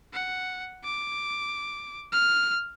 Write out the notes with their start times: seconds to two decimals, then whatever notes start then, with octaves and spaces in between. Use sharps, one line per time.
0.14 F#5
0.84 D6
2.12 F6